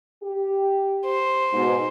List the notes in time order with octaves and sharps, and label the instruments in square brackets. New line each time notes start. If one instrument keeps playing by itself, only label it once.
[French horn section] G4
[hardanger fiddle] C5
[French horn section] G#2 B2